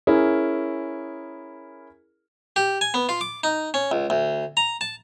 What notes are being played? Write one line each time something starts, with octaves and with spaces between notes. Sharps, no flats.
C#4 E4 G#4 A#4
G4
G#5
B3
F4
D6
D#4
C#4
C#2
D2
A#5
A5